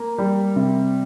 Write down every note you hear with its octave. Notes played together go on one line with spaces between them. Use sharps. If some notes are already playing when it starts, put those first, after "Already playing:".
Already playing: A#3
G3
C3